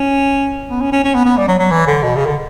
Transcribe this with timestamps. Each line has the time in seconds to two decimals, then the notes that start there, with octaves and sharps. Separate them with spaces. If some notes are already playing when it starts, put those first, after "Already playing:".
Already playing: C#4
0.70 B3
0.81 C#4
0.93 C#4
1.04 C#4
1.15 B3
1.25 B3
1.37 G3
1.48 F#3
1.59 F#3
1.71 E3
1.87 D3
2.04 B2
2.15 C#3
2.26 D3